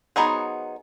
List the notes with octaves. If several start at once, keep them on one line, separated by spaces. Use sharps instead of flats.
F#3 B3 D#4 G#4 C5